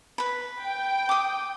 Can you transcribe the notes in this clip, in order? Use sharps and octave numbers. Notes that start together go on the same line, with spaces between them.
B4 B5
G5
D6 D#6